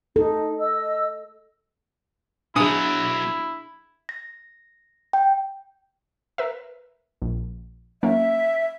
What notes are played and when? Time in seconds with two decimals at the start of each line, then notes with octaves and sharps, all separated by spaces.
0.16 D#4 A4
0.59 D#5 E6
2.56 B2 F#3 D4 E4 G#4 D#6
4.09 A#6
5.13 G5
6.38 A#4 B4 E5
7.22 A#1
8.03 F#3 A#3 C#4 E5